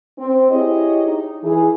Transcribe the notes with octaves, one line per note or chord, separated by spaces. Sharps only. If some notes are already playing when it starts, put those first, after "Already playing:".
C4
E4 G4 G#4 C#5 D#5
D#4
E3 G#4